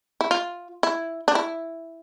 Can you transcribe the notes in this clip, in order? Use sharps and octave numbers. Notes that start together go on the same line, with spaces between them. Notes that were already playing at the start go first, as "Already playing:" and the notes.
E4
F4
E4
D4
E4